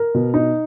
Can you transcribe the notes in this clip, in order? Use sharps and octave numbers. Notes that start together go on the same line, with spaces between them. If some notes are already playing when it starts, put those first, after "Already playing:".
Already playing: A#4
B2
D#4